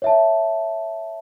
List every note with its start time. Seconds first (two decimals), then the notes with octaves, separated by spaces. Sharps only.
0.02 C#5 E5 A5